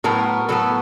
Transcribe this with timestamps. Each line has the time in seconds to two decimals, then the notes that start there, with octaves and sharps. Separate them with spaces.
0.04 A2 F#3 B3 A#4
0.49 A2 F#3 B3 A4